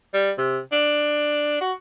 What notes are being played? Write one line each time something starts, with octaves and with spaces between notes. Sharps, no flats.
G3
C3
D4
F#4